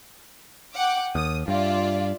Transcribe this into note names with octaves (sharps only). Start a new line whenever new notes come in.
F#5 G5 D6
D#2 D#6
G2 F4 D5 E5